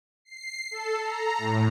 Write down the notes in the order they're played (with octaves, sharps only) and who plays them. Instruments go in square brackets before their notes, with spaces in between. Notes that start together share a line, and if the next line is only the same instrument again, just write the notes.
[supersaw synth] C7
A4
A#5
A2